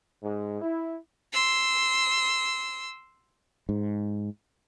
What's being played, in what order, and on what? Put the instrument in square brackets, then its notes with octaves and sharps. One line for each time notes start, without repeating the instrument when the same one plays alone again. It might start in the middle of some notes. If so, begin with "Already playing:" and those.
[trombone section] G#2
E4
[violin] C6 E6
[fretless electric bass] G#2